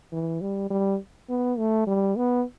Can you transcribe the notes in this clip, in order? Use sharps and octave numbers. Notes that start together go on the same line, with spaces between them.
E3
G3
G3
B3
A3
G3
B3